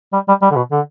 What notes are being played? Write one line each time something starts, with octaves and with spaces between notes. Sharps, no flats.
G3
G3
G3
D3
B2
D3